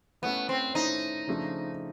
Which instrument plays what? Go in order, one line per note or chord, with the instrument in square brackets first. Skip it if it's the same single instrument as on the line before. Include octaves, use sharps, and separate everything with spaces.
[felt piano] A3 C#4 E4 [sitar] B3
[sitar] C4
[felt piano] A3 C#4 E4 [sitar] D#4
[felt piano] C#3 F3 A3 D4